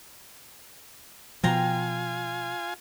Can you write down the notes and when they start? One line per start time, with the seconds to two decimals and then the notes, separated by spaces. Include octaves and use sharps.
1.43 B2 F3 F4 G5 G#5 A#5 C6